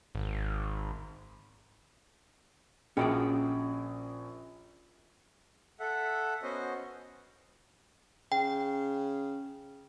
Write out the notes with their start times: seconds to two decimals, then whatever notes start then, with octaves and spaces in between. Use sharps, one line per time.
0.15 G#1
2.97 A#1 C#4 F#4 G#4 D5 G5
5.80 A4 E5 F#5
6.43 B3 C#4 F#4 C5 D#5
8.32 C#3 G5